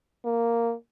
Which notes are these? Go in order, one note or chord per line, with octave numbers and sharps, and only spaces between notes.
A#3